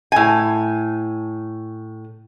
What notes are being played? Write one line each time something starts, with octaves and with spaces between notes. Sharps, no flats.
A2 G#5